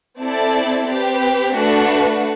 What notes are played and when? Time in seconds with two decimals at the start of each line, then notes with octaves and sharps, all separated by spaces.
0.20 C4 E4 A4 D5 A5
0.88 C4 G4 B4
1.55 A3 D4 F#4 B4 F#5